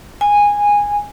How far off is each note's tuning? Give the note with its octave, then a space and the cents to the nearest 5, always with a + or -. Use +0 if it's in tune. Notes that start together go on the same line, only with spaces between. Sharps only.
G#5 -15